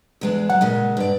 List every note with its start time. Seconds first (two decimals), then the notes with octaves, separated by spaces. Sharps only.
0.21 E2 G#3 D4
0.50 F#3 F#5
0.61 A#2 C#3 G#3
0.97 G2 D5